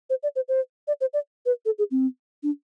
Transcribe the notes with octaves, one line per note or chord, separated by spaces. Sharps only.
C5
D5
C5
C5
D5
C5
D5
B4
A4
G#4
C4
D4